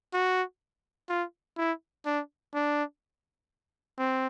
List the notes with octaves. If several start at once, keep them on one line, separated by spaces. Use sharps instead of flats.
F#4
F4
E4
D4
D4
C4